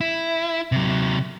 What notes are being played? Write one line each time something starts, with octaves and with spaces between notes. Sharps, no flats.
E4
C3 F#3